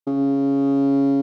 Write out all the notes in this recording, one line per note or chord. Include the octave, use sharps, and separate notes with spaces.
C#3